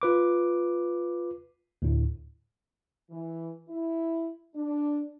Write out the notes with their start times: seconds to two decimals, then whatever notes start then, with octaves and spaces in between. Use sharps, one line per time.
0.02 F4 B4 D6
1.82 D2 A2
3.10 E3
3.69 E4
4.55 D4